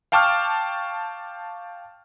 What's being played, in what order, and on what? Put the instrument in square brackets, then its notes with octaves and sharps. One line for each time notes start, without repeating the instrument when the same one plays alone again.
[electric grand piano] F5 G5 A5 C#6 D6 F6